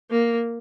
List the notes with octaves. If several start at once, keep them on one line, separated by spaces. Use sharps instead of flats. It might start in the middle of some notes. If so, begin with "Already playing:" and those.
A#3